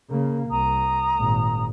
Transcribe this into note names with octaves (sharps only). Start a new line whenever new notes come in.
C#3 A#3
C2 A#5 D#6
G#1 A#2